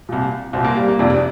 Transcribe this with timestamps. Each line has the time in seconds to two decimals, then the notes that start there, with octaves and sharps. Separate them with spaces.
0.09 C2 A#2
0.53 C2 A#2 C4
0.65 A#3
0.77 G3
0.88 A#3
0.99 F2 C3 D4
1.10 D4